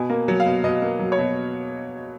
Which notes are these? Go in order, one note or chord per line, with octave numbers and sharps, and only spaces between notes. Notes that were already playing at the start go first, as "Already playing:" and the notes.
Already playing: B2 G#5
A#3
F#3
F5
B2
B2 D#5
A#3
F#3
C#5
B2